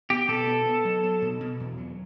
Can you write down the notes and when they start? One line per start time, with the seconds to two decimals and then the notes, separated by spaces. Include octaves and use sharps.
0.10 B3 G4
0.28 B2 A4
0.47 B3
0.66 B3
0.85 F#3
1.03 F#3
1.22 B2
1.40 B2
1.60 E2
1.77 F#3